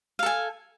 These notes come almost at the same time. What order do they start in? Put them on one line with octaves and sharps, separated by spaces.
F5 A4 G#5